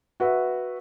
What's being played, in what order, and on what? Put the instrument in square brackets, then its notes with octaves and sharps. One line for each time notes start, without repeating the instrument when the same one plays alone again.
[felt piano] F#4 B4 E5